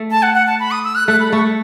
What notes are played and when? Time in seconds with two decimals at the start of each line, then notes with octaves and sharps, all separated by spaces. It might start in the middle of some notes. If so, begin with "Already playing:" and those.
Already playing: A3
0.11 A5
0.22 F#5
0.35 F#5
0.47 A5
0.60 B5
0.71 D#6
0.84 E6
0.95 F#6
1.08 A3 F#6
1.20 B5
1.32 A3 C#6